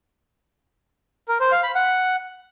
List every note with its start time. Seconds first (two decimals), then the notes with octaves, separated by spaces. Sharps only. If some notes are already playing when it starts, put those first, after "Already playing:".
1.28 A#4
1.40 C5
1.52 F5
1.63 B5
1.75 F#5